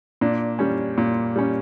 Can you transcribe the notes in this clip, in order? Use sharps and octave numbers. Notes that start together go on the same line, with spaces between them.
A#2 D4
G3 C#4
A#2
G3 C#4